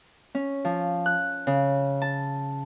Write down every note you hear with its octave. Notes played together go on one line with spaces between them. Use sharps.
C#4
F3
F#6
C#3
A5